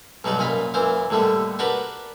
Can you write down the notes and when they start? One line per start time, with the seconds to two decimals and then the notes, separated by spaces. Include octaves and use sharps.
0.24 B1 F#3 G3 D#4 D5
0.38 F#2 A#2 D#5 F5 B5
0.74 F#2 E3 C5 F5
1.10 D#2 A2 D3 G3 A3
1.59 D4 F#4 G4 A#4 B4 D5